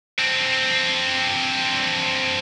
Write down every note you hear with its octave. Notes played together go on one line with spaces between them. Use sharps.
C4 D4